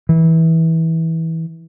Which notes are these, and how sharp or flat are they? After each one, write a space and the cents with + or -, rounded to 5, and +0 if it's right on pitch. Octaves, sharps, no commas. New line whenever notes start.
E3 -20